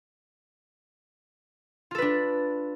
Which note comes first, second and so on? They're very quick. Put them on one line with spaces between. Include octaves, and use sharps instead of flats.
F4 A4 B4 D4